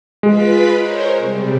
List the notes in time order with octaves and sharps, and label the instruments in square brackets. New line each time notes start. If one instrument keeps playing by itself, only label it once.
[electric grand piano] G#3 [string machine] F4 B4 B5
[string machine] A#4 C5 C#5
C3 G3